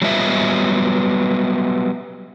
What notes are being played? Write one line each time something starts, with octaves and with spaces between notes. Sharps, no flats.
F#3 G3 B3 F4 D#5 E5